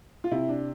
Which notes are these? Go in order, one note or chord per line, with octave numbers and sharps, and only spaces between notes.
F4
C3 E4
D4